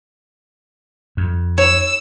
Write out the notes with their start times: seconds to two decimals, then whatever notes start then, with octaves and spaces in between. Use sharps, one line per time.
1.17 F2
1.58 C#5 E6